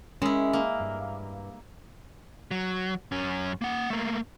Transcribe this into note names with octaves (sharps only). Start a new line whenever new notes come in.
G#3 C#4 E4 A#4
A#3
G2
F#3
F#2 C#4
A#3 F#5
A3 A#3